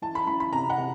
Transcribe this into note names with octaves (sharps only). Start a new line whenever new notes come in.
E3 A5
B5
E3 B5
B5
C3 A#5
F#5
C3